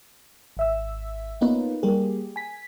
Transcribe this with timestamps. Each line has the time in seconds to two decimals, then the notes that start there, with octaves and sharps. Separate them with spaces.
0.57 G#1 E5 E6
1.41 A#3 B3 C#4 D#4 F4 B4
1.83 G3 A#3 G4 G#4
2.36 G#5 B6